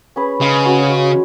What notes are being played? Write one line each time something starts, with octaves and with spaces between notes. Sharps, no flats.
C#4 G#4 B4
C#3 G#3
C#4 F#4
G#3